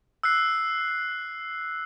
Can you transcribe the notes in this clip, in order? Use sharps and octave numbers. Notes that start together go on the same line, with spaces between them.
E6 F#6 C7